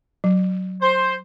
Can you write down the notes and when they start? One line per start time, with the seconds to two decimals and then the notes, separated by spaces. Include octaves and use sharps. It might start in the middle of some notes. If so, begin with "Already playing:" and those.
0.24 F#3
0.82 C5